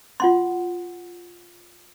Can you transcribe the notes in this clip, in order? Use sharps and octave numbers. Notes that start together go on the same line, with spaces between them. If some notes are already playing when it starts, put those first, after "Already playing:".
F4 F#5 C6